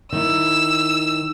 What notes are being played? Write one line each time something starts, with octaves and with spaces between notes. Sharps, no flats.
D#3 E4 E6